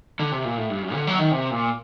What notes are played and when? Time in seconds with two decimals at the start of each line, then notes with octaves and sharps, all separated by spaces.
0.20 D3
0.32 C3
0.45 A#2
0.57 A2
0.70 G2
0.82 F#2
0.94 D3
1.07 F#3
1.19 D#3
1.31 C3
1.51 A#2